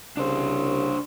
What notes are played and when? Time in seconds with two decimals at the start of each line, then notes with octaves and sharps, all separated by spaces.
0.17 C2 C#3 D4 C5